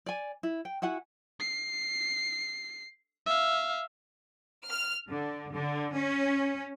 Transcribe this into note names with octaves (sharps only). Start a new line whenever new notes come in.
D5 G#5
E4
G5
E4 F#4 F#5 G#5
C7
E5 F5
F6
D3
D3
C#4